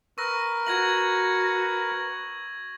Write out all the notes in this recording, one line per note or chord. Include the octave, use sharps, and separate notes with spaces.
A#4 B4 C#6 E6 A#6
F#4 G#6 A#6 F#7